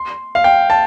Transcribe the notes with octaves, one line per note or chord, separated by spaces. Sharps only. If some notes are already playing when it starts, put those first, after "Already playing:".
Already playing: C6
F5
G5
A5